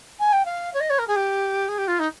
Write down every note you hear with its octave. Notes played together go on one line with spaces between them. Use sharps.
G#5
G5
F5
C#5
D#5
C#5
A#4
G#4
G4
G#4
G4
F4
D#4